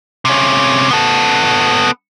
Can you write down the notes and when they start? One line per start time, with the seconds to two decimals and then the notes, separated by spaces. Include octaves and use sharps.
0.25 C3 C#4
0.91 B3 A4